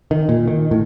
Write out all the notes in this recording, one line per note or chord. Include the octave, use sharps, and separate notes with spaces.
D#3
A#2
D#3
A2